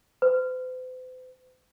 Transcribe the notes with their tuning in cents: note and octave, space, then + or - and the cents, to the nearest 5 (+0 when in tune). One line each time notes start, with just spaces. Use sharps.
C5 -45